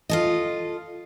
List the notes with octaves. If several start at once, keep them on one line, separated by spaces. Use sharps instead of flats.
F4 A4 D#5